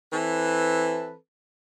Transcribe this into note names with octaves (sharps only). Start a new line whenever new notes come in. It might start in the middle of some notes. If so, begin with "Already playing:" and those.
E3 C4 A4 B4